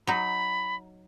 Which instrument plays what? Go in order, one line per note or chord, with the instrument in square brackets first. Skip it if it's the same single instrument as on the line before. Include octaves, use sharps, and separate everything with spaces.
[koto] F#3 D#4 [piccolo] B5